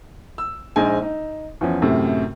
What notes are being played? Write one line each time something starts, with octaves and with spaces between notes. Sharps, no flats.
E6
A#1 G#3 D#4 C5 G#5
D#4
E2 F3 C#4
F#2 A2 C3